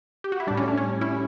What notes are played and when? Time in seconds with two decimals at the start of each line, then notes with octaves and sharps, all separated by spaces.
0.24 G4
0.32 F#4
0.40 E4
0.47 G3 D4
0.51 A2
0.57 C#4
0.68 D4
0.77 C#4
1.01 C#4 E4